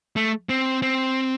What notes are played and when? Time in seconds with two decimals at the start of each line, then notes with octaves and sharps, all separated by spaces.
0.16 A3
0.49 C4
0.82 C4